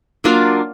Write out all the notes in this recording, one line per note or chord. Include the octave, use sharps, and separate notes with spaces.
F#3 A#3 D4 F4